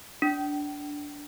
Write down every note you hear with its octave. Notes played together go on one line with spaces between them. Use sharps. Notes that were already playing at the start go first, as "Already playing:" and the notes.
D4